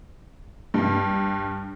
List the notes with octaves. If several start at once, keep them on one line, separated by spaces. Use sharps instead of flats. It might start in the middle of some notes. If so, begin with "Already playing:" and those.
G2